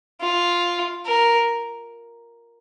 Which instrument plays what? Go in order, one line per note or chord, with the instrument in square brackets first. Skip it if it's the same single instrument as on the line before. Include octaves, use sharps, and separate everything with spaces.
[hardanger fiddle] F4
A#4